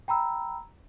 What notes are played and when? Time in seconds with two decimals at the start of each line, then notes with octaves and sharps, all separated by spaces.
0.08 G5 A#5 B5 E6